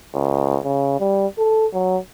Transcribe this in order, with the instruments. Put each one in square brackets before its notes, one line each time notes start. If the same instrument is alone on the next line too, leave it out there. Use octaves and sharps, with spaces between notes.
[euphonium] C#2
C#3
G3
A4
F#3